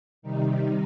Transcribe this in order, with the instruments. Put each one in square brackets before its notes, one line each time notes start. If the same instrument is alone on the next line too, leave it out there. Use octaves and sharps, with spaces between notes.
[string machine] C3 D#3 G3 D#4